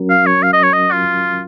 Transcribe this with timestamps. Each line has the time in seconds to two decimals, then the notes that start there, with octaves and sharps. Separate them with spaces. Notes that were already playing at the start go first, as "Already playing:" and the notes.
Already playing: F#3 C#4 F#4 A#4
0.10 F5
0.26 C#5
0.43 F5
0.53 D#5
0.63 C#5
0.73 D#5
0.92 F4